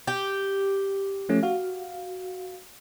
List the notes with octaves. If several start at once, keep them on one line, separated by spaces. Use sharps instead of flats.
G4
F3 A3 C#4
F#4 F5